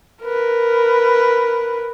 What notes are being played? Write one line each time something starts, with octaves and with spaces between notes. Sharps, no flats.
A#4 B4